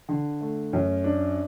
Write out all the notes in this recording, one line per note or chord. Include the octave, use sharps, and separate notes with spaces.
D3
A3
F#2
D4